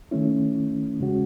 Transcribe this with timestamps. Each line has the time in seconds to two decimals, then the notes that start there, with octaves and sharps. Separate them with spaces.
0.11 D#3 A3 C#4 E4
1.00 E2 C#3 G#3 C#4 F#4